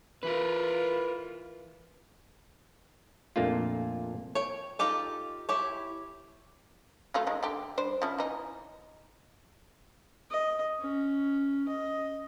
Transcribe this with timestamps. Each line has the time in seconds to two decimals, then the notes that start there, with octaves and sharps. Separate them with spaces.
0.23 E3 F4 A#4 B4
3.36 F2 A#2 A3 A#3 D4 F4
4.35 C#5 G5
4.79 D#4 F4 G4 A4
5.49 E4 G4 C#5
7.14 F#3 A3 F4
7.27 D#3 G#3 D#4
7.43 D3 G4
7.77 G3 D4 C5
8.02 F3 C#4 E4
8.18 E3 D#4
10.31 D#5
10.80 C#4
11.68 D#5